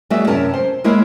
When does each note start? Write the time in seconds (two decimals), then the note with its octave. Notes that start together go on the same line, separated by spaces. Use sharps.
0.10 F#3 G#3 A#3 F#4 D5 E5
0.27 F#2 C3 C#4 A#4 A5
0.54 C5
0.84 G#3 A#3 E4 A#4 C#5 F5